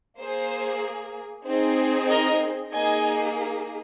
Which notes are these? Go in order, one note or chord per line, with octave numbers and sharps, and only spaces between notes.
A#3 G#4 C5
C4 D#4 G#4
A#4 D#5
A#3 D#4 G#4 D#5 G#5